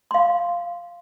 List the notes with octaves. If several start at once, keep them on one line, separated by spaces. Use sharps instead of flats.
F5 C6